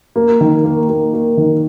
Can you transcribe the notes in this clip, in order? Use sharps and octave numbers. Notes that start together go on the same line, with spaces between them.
A#3
D#3
A#3
A#3
A#3
D#3